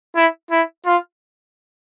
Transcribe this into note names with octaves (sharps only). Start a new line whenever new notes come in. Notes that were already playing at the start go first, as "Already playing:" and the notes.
E4
E4
F4